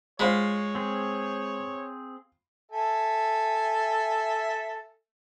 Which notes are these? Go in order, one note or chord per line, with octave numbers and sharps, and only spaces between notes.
G#3 F4 C5 C#5 B5
C4 G#4
A4 E5 G#5